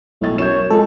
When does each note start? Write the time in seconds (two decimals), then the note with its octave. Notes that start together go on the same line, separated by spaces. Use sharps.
0.22 B1 A2 A6
0.38 F#2 C#5 G6 E7
0.70 F2 G#3 A4